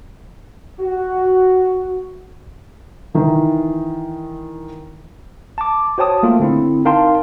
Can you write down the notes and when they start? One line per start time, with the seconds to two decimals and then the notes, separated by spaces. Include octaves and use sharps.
0.80 F#4
3.14 D#3 E3
5.58 A5 D6
5.98 F#4 C5 C#5 G5 A5 D#6
6.23 A3 A#3 F4
6.40 D3 C4 E4
6.85 D#4 A#4 F5 G5 A5 C6